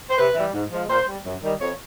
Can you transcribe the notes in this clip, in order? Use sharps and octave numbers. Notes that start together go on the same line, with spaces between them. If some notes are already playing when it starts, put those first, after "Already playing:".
C5
C3 B4
E3 G3
G#2
F3 G#3
A#2 C5
G3
F#2
D#3 G3
F2 C#5